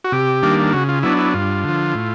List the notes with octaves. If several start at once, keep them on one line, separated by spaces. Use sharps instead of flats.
F#4
C3 G4
D#3 G3 A#3 D4
C#3 F#4
F4
F#3 B3 D4 E4
E4
G2 F4
D3
F3
A2